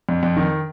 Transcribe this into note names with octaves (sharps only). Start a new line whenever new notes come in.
F2
F2
D#3